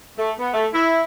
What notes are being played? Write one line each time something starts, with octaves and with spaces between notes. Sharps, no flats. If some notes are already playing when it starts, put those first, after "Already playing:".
A3
B3
A3
E4